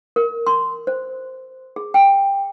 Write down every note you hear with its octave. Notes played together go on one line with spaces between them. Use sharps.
A#4
C6
C5
G#4
G5